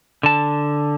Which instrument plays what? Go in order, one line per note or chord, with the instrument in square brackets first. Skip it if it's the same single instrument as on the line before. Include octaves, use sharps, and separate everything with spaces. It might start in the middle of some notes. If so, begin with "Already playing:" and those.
[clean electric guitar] D3 A5